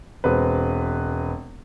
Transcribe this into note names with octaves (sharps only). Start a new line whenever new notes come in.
E1 C4 B4